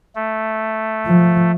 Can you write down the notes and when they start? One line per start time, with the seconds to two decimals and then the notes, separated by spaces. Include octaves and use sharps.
0.15 A3
1.07 F3